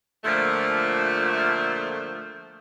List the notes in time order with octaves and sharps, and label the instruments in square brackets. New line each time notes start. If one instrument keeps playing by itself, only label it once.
[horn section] A#2 D3 F3 A3